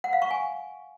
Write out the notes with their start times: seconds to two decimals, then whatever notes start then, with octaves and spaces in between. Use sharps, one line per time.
0.04 F#5
0.13 F5
0.22 C#6
0.31 G#5